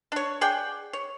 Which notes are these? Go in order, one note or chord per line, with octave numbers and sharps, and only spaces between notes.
D4 C#5
G#4 D5 F#5 G5
C#5